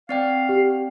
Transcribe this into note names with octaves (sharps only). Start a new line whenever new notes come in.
C4 D5 F5 G5
G4